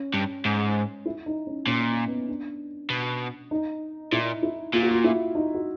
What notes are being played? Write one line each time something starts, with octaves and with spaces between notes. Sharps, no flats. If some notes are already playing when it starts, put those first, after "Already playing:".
Already playing: C#4
G2
G#2
E4
D#4
C#4
A#2 C#4
B3
D4
B2
D#4
A#2 E4
E4
A#2 F4
F#4
F4
E4
D#4
F#4